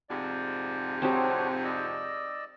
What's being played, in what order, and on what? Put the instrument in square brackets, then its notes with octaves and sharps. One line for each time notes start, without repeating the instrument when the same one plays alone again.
[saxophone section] F2 G#2 C3 [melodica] D5
[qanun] C4 D#4 G4 [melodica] D4 F#4 C#5
[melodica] D5 D#5 E6